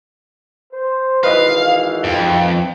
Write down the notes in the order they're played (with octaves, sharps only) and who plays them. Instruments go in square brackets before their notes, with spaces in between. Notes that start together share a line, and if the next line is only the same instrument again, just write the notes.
[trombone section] C5
[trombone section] G#1 E3 [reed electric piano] B4 D#5 [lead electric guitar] F5
[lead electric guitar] F2